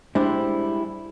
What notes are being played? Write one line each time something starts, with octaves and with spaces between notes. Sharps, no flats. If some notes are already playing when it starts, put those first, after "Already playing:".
G3 G#3 D4 E4 C5